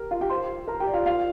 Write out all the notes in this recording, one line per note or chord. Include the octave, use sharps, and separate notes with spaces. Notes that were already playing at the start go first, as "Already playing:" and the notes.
Already playing: G4 A#4
F4 F5
G4 G5
C5 C6
A#4 A#5
G4 G5
D5
F4 F5
F4 F5